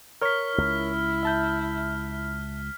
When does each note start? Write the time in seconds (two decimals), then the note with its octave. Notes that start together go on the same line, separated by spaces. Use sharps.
0.22 A#4 C#5 C#6 F6 B6
0.58 C#2 E4
1.23 E5 A5 G6